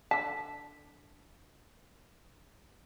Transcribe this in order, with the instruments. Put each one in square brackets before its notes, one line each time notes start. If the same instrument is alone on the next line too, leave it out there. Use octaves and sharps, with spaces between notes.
[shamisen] D3 A5 [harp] B6